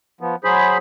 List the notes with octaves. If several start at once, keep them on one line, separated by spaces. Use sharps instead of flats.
F3 B3
F#3 G#4 C5 B5